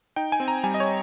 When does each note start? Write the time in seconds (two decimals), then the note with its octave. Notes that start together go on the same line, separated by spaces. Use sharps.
0.16 D#4 G5
0.32 G#5
0.40 C4
0.48 A#5
0.64 G3 G#5
0.74 D#5
0.80 C#5